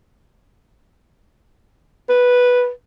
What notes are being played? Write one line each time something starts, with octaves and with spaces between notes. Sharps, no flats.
B4